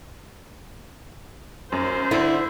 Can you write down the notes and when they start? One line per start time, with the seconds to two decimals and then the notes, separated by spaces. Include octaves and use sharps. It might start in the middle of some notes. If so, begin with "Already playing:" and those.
1.72 F#2 C5
2.11 D3 E4